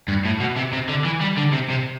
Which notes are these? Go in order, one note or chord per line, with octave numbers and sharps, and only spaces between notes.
G2
A2
B2
C3
C3
D3
E3
G3
D3
C3
C3